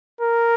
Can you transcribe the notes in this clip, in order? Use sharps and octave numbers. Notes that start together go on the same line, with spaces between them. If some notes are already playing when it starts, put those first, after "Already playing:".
A#4